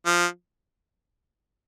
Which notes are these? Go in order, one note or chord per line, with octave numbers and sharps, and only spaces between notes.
F3